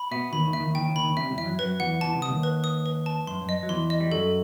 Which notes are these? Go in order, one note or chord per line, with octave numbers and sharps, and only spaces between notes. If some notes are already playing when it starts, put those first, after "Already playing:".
Already playing: B5
B2 B3 E5
D#2 D#3 B5
D#2 D#3
E5
D#2 D#3
D#2 D#3 G5
D#2 D#3
B5
D#2 D#3
C2 C3 E5
E2 E3
E5
F#2 F#3
F#2 F#3 B4
E2 E3 F#5
E2 E3 A5
C2 C3
D#6
D#2 D#3
B4
D#6
B4
A5
F#2 C6
F#2
D#5
F#3
E2 E3 C6
D#5
G3
F#2 F#3 A4